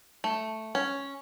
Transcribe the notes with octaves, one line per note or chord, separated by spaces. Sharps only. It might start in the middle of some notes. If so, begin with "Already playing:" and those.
A3
C#4